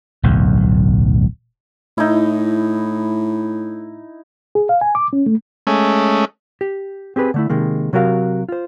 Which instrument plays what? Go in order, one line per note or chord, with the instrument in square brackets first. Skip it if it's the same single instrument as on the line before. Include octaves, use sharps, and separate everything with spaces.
[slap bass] D1 B1 E2
[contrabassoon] A2 [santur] D#4 E4
[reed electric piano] G#4
F5
G#5
D6
C#4
A3
[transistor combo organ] G#3 A3 C#4
[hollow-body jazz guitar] G4
C4 G4 G#4 B4
D3 A3 E4
C3 D#3 G#3 A#3
C3 F#3 F#4 A#4 E5 F5
F4 C5